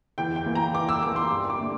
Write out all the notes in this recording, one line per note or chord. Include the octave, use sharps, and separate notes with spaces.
E2 G5
G5
E3 A#3
A#5
E2 D6
E6
E3 A#3 D6
C6
G2
D6
D3 A3